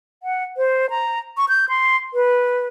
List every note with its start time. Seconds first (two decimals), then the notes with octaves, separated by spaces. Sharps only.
0.23 F#5
0.57 C5
0.90 A#5
1.37 C#6
1.49 G6
1.69 C6
2.14 B4